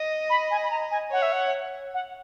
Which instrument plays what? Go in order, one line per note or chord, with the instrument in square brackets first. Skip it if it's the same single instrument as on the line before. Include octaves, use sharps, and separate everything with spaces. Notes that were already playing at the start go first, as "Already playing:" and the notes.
Already playing: [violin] D#5
[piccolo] B5
G#5
B5
A#5
G#5
[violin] C#5 [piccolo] F#5
[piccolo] E5
F#5
F#5